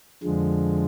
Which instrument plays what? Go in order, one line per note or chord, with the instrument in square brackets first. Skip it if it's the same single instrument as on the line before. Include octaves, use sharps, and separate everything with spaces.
[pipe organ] F2 D3 F3 G#3